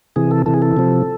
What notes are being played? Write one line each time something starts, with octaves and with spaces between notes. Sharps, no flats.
C3 E3 G#4
A4
C3 E3 A4
G#4
A4
C3 F3